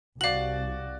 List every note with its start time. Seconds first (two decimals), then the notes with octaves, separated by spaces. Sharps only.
0.21 C2 F#4 D5 F5 F#7